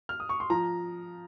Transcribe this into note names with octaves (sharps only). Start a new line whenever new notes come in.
F6
D#6
C#6
C6
F3 A#5